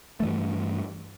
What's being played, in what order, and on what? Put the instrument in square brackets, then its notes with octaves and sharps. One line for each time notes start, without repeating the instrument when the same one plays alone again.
[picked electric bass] G2 E3 A3